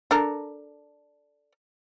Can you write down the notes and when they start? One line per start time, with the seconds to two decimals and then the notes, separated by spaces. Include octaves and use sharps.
0.11 D4 A4 A#4